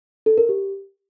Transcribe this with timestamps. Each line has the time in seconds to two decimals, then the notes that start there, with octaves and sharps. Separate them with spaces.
0.26 A4
0.38 A#4
0.49 G4